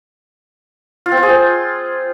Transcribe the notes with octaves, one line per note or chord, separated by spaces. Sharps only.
F4
C4
F4
G#4
C5